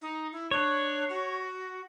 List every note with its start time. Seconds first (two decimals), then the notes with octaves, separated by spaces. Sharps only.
0.02 D#4
0.32 E4
0.51 D4 C#5
1.09 F#4